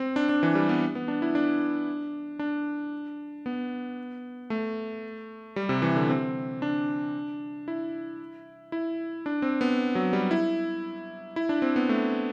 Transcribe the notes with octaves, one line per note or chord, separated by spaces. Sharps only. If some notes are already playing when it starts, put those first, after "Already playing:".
Already playing: C4
D4
D4
E3
G3
B3
B3
D4
E4
D4
D4
B3
A3
G3
C3
E3
D3
C4
D4
E4
E4
D4
C4
B3
F#3
G3
E4
E4
D4
C4
B3
A3